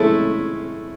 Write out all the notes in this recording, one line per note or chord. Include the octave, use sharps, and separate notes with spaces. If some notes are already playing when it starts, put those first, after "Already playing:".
Already playing: G#3 A3 C#4 E4